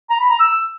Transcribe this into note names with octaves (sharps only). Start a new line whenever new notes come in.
A#5
B5
A#5
E6